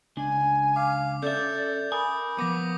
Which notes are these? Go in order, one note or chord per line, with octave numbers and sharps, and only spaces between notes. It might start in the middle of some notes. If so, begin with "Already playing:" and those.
C#2 D4 G#5
F5 D6
C#4 A4 D5 E5 G6
A#4 G#5 B5 D#6
F3 B3 D6 A#6